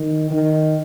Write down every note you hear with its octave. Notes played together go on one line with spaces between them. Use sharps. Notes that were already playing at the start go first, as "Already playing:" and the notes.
Already playing: D#3
D#3